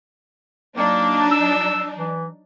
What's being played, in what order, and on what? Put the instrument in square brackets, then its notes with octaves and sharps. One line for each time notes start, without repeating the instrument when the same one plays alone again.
[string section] F#3 D4 D#4 [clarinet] A#3
[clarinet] E6
E3